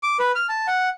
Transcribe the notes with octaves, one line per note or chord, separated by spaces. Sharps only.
D6
B4
F6
A5
F#5